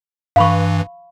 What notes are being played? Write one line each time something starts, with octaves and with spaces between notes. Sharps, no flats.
G2 E3 F5 B5 C#6